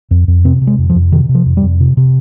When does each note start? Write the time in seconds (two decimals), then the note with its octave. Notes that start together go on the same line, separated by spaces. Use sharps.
0.11 F2
0.28 F2
0.45 C3 C4
0.61 C3
0.67 G#3
0.78 F2
0.90 F3
0.96 F2
1.12 C3 D#3
1.29 C3
1.35 F3
1.46 F2
1.57 G3
1.63 F2
1.80 C3
1.97 C3